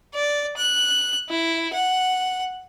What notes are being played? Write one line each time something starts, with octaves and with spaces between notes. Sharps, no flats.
D5
F#6
E4
F#5